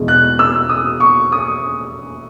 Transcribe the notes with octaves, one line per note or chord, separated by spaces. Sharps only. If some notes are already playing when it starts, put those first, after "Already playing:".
Already playing: E2 B2 G#3
F#6
E6
D#6
C#6
D#6